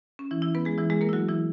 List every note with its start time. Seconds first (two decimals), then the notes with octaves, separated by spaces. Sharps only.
0.19 C#4
0.31 E3 E4
0.42 E3 E4
0.55 B3 B4
0.65 G#3 G#4
0.78 E3 E4
0.90 G#3 G#4
1.01 A#3 A#4
1.09 E4
1.13 F#3 F#4
1.29 E3 E4